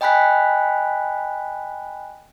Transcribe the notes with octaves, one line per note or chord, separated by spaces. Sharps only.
D#5 G5 G#5 B5 F#6 B6